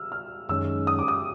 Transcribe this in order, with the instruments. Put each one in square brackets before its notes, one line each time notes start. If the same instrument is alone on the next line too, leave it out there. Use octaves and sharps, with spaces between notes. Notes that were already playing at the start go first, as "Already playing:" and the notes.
Already playing: [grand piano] E6 F6
F6
[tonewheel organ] F#2 D#3 G#3 C#4 [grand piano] E6
[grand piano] D#6
D6
D#6